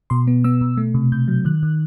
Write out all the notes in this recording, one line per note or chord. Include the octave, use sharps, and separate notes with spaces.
B2 C6
B3
B3 E6
B2
A3
C3
C3 G6
F#3
D#3 F#6
D#3